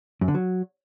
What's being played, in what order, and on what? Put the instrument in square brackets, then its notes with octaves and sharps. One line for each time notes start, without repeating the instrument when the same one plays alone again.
[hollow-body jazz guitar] F#2
D3
F#3